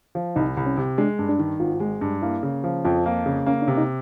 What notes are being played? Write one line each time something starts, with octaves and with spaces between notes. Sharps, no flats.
F3
C2 D#4
C2
C#4
C3
G#3 D4
G2
D4
D#3
G#1 F4
G#3
G2
A#3 E4
C#3
F3
F2 F4
A#3
C#3
A#3 C#4
D4
C3
D#4